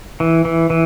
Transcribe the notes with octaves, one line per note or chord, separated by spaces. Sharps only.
E3
E3
E3